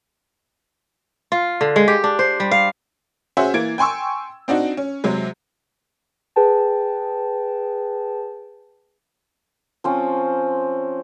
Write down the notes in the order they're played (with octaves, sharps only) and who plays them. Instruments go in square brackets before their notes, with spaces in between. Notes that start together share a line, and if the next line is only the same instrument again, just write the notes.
[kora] F4
D3
G#3
G4
D4
C5
G3
F5
[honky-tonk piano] C#4 F#4 G#4 C5 E5
E3 A#3 G#6 A6 D7
G5 G#5 C6 C#6 E6
C4 D4 D#4 F#4
C#4
C3 F#3 G#3
[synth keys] G#4 B4 G5 A5
[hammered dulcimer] F3 C4 C#4